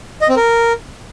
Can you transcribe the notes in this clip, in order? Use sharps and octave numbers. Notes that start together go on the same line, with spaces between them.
D#5
C4
A#4